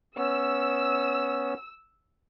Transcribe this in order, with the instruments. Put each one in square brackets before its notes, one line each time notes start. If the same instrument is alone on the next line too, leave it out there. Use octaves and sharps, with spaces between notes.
[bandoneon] B3 C#4 [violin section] E6